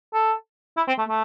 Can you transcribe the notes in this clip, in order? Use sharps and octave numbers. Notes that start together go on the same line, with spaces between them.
A4
E4
C4
A3
A3